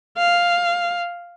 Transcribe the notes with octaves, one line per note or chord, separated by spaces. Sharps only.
F5